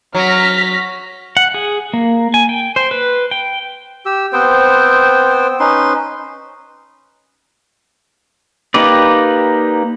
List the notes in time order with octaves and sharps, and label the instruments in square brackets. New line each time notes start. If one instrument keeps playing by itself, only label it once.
[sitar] F#3 [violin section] F6 A#6 B6
[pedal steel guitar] F#5
G#4
A#3
G#5
G5
C5
B4
G5
[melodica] G4 E6
B3 C4 C5 G5
C#4 D#4 B4 C6
[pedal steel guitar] A#3 D#4 G4 B4 D5